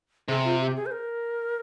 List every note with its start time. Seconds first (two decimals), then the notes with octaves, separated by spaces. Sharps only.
0.28 C3 G#4
0.44 F4
0.61 G4
0.76 G#4
0.86 C5
0.92 A#4